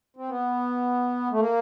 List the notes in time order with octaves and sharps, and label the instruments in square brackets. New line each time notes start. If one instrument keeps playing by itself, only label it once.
[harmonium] C4
B3
A3
A#3